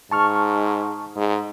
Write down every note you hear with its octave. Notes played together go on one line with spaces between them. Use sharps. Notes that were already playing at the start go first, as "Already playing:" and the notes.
G#2 A5 C#6 F6
G#2